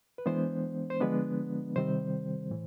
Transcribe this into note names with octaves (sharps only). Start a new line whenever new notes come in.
B4
E3 G#3 B3 D4 C5
C5
D3 F3 G#3 B3 D4 B4
C3 D#3 G3 C4 C5
A2 E3